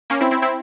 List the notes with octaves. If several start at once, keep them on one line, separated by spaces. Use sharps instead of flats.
A#3 C#4
C4 E4
C4 E4
C4 E4